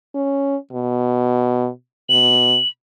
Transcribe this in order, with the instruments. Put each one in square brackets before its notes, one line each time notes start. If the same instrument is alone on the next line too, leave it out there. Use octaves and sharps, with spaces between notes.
[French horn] C#4
B2
[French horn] B2 [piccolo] F#7